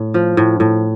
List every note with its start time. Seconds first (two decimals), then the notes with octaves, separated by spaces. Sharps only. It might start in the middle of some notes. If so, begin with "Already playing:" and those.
Already playing: A2
0.14 F3
0.37 A2
0.60 A2